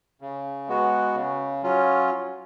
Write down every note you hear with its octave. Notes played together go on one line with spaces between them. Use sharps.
C#3
G#3 B3 F#4
C#3
F#3 C#4 F4